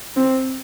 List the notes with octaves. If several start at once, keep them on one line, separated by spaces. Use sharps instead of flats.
C4